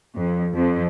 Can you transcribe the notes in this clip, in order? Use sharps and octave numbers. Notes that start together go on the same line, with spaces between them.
F2
F2